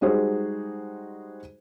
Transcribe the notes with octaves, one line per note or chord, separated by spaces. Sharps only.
G3 G#3 D#4 F#4 G#4 C5